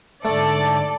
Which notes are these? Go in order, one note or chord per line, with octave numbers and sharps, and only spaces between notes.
G#2 D3 A3 A4 D5 A5